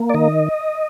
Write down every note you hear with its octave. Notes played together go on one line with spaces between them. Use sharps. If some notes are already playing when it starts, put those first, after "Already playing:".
Already playing: A#3
D5
D#3 D#5